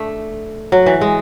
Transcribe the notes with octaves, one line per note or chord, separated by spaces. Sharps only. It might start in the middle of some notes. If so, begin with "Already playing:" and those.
Already playing: A3 D4
F#3
E3
G#3